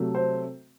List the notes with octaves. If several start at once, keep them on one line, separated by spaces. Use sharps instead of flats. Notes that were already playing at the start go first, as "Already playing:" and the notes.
Already playing: C3 F#3 A3
C5